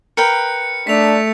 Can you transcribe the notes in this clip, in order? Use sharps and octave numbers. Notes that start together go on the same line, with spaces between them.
A#4 B4 G5 C#7
A3 D4 B6 F7